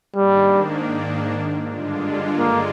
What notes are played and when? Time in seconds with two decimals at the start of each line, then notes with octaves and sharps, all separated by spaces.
0.16 G#2 D#3 G3 A#3 D4
1.64 G2 D3 G#3 D4 F4
2.38 A#3